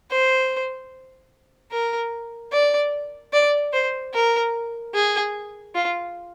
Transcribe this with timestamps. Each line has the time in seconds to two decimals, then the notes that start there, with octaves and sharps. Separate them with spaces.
0.11 C5
1.72 A#4
2.52 D5
3.33 D5
3.73 C5
4.14 A#4
4.94 G#4
5.75 F4